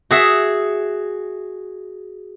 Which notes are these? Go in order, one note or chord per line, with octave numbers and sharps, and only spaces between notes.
F#4 G#4 E5